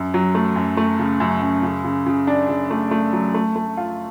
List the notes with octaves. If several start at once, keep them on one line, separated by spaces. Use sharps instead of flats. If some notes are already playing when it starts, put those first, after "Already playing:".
Already playing: F#2
F#3
A3
F#2
A3
C#3
F#2
F#2
C#3
C#3
C#3
D4
C#3
A3
A3
F#3
A3
A3
F4